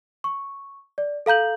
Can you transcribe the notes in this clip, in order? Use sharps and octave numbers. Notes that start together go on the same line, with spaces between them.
C#6
D5
A4 F5 A#5 G6 F#7